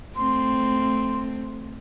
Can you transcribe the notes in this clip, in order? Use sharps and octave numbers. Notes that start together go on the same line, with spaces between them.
A3 C4 C6